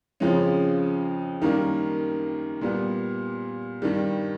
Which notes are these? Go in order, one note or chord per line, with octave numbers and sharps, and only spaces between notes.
F2 C#3 F3 G#3 C#4
F#2 D#3 G3 A#3
A#2 G3 B3
G2 D#3 G3